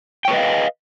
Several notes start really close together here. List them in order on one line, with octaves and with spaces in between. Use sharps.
G5 C#5 B4 D#5 F5